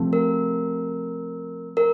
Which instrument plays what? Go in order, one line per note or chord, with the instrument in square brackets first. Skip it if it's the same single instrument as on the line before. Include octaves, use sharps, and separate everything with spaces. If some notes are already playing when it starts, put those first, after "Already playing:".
Already playing: [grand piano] C3 F3 A3 C4
[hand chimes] A#4
A#4